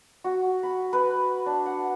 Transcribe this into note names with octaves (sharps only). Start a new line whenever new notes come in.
F#4
B5
B4
D4
F#5